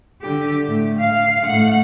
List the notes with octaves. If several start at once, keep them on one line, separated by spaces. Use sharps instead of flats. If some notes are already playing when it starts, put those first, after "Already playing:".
D3 G4
A2
F5
A2 F#5